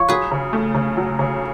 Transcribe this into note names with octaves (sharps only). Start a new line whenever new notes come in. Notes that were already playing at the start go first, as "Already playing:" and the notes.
Already playing: F3 F4 C#5
F#3 G#4 B4
C#3
A3
C#3
F#3
C#3